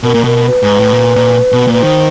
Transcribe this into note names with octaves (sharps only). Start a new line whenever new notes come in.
B2 A#4
A#2
B2 A#4
B4
G#2
A2
A#2
A#2
B2
A#2
B4
D#3 C5